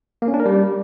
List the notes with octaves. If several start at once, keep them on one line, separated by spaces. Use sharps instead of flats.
A#3
C#4
D4
A#4
G3